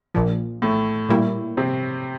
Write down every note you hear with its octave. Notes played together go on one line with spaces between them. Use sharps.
A#1 A#2 F3
A2 A3
A#2 G3 A#3 E4
C3 C4